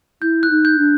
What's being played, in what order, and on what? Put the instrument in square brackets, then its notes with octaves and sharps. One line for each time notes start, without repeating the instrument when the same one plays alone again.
[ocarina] E4 [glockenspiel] G6
[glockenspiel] F#6
[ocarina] D#4
[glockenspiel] G6
[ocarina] D4